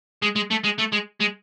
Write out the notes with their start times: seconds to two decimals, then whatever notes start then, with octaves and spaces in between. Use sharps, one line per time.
0.22 G#3
0.36 G#3
0.50 A3
0.64 G#3
0.78 A3
0.92 G#3
1.20 G#3